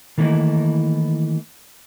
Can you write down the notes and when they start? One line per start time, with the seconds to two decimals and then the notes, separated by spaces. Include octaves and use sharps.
0.18 D#3 E3 A3 A#3 E4 D#5